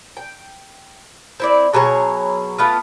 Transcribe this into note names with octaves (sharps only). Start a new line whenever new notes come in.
G5
C4 E4 D5
B2 F#3 G#4 C#5
A3 B3 F4